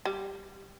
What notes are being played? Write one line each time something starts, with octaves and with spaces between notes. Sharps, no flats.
G3